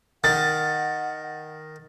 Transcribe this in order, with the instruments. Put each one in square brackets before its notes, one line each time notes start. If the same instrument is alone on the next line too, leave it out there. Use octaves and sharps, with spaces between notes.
[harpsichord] D#3 [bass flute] F#5 [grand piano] A6